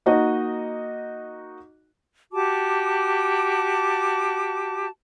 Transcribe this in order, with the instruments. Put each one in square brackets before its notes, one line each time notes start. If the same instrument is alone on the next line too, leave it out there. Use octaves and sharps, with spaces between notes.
[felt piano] A#3 D#4 F#4 D#5
[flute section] F#4 G4 A5 D6